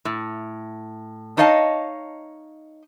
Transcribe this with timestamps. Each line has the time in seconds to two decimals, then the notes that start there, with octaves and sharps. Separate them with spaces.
0.05 A2
1.37 D4 D#4 C#5 D#5 F5 A5